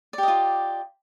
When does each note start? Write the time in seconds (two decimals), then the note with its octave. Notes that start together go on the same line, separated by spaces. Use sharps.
0.13 D5
0.18 G4
0.23 D#5
0.28 F4